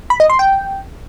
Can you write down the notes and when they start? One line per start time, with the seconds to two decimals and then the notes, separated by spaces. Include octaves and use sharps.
0.10 B5
0.20 D#5
0.30 C6
0.39 G5